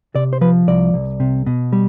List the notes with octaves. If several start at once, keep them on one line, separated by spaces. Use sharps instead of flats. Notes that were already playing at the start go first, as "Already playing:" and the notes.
C3 D5
C5
F3 B4
C2 D5
C2
C3
B2
G3